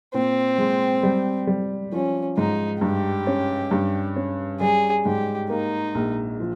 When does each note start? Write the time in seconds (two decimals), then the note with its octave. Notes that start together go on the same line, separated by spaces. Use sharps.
0.14 A#2 C4
0.58 G#3
1.03 G3
1.47 G3
1.92 F3 C#4
2.37 G#2 D#4
2.81 G2 G4
3.27 C#4
3.71 G2
4.16 C#4
4.60 G3 G#4
5.05 G#2 G4
5.50 A#3 D#4
5.95 A#1
6.40 F3